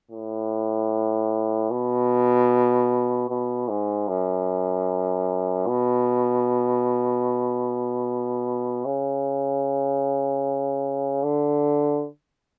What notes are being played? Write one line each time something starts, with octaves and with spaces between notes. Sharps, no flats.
A2
B2
B2
G#2
F#2
B2
C#3
D3